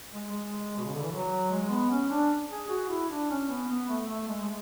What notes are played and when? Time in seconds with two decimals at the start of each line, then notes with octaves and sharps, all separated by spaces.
0.12 G#3
0.32 G#3
0.77 B2
0.85 C#3
0.94 D3
1.02 E3
1.12 F#3
1.51 G#3
1.70 B3
1.90 C#4
2.10 D4
2.49 G#4
2.69 F#4
2.89 E4
3.10 D4
3.30 C#4
3.48 B3
3.68 B3
3.88 A3
4.08 A3
4.28 G#3
4.43 G#3